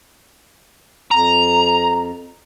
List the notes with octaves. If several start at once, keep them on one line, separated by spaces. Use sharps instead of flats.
F2 A#5